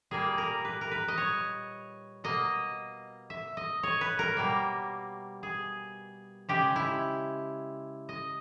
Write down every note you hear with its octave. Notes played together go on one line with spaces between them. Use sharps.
A#2 G3 A#3 G#4
A#4
B4
A#4
B4
D#5
C#5
B2 A#3 D#5
E5
D#5
C#5
B4
A#4
B2 G3 A#3
G#4
C#3 G#3 G4
E4
D#5